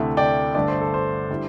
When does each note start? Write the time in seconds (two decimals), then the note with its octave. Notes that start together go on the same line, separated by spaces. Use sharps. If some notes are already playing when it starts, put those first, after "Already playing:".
Already playing: D2 C3 A3 E4
0.17 D5 G5
0.55 G1 G2 D3 A3 D5
0.68 C5
0.81 A4
0.94 C5
1.30 D3 G3 E4